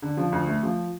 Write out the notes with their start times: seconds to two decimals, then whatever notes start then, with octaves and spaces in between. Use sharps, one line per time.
0.02 D3
0.17 F3
0.32 D2
0.47 A3
0.63 F3